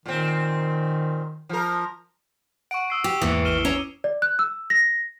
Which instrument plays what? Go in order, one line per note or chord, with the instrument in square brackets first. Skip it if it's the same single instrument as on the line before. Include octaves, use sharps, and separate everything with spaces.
[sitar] A#2 C4 [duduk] D#3
[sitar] F3 A#4
[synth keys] F#5 [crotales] C#6 D7
[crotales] D#6 E6 C7
[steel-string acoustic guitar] G4 [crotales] D6
[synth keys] E2 G#2 A#3 [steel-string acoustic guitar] E3 [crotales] D#6 C#7
[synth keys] A1 F6 [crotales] D#7 E7 G7
[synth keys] C#4 [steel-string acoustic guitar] C#5 A#5
[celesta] D5
F#6
E6
A#6